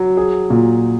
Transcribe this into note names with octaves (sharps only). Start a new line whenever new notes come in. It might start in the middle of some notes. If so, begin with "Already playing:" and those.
Already playing: F#3
G#4
A#2